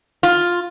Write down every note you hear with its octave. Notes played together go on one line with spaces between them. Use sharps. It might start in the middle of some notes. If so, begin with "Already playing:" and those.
F4